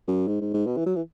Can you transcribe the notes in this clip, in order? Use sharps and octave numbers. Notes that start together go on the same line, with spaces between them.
F#2
G#2
G#2
G#2
B2
E3
F#3
E3